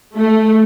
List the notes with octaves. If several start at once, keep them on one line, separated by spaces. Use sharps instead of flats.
A3